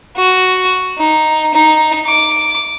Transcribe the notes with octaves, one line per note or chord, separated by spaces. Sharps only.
F#4
D#4
D#4
D6